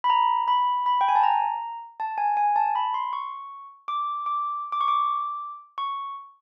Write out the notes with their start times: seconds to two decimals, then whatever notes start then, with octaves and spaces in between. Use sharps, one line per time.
0.04 B5
0.10 A#5
0.48 B5
0.86 B5
1.01 G5
1.08 G#5
1.15 A5
1.23 A#5
2.00 A5
2.18 G#5
2.37 G#5
2.56 A5
2.75 B5
2.94 C6
3.13 C#6
3.88 D6
4.26 D6
4.72 D6
4.81 C#6
4.88 D6
5.78 C#6